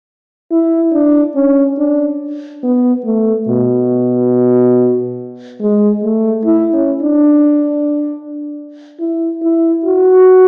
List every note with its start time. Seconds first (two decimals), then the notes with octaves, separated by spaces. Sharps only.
0.51 E4
0.93 D4
1.36 C#4
1.78 D4
2.63 B3
3.05 A3
3.48 B2
5.60 G#3
6.03 A3
6.45 E4
6.73 C#4
7.02 D4
9.00 E4
9.42 E4
9.85 F#4